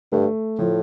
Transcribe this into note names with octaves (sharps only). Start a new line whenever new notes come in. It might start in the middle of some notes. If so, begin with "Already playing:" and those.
G2 A3
A2 F3